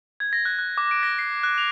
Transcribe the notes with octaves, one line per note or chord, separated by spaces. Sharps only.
G#6
A#6
F#6
F#6
D6
D7
A#6
C7
F#6
F7